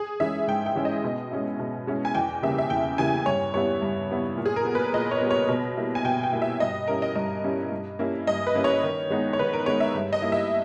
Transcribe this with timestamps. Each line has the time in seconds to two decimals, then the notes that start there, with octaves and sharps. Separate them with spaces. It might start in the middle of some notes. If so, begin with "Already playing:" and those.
Already playing: G#4
0.20 E3 G#3 C#4 E4 E5
0.47 G#2 G5
0.66 G5
0.75 E3 G#3 C#4 E4
0.85 D#5
1.04 B2
1.31 G#3 C#4 E4
1.59 B2
1.87 G#3 C#4 E4
2.05 G#5
2.15 E2 G5
2.42 C#3 E3 G3 A#3 E5
2.58 E5
2.70 E2 G5
2.98 C#3 E3 G3 A#3 G#5
3.26 G2 C#5
3.54 G3 B3 E4 C#5
3.82 G2
4.10 G3 B3 E4
4.37 A#2
4.46 G#4
4.56 A#4
4.65 G3 B3
4.75 B4
4.93 A#2 D#5
5.11 C#5
5.21 G3 B3
5.31 C#5
5.49 B2
5.77 G3 A#3 E4
5.95 G#5
6.05 B2 G5
6.23 G5
6.32 G3 A#3 E4
6.42 E5
6.60 G2 D#5
6.88 G3 C#4 E4 A#4
7.02 D#5
7.15 G2 D#5
7.44 G3 C#4 E4
7.72 G2
7.99 G3 A#3 C#4 E4
8.27 G2 D#5
8.47 B4
8.55 G3 A#3 C#4 E4
8.64 C#5
8.83 D#3
9.10 G#3 B3 D#4
9.33 C#5
9.39 D#3 B4
9.53 A#4
9.66 G#3 B3 D#4 C#5
9.80 E5
9.94 G2
10.13 D#5
10.22 G3 A#3 E4
10.32 E5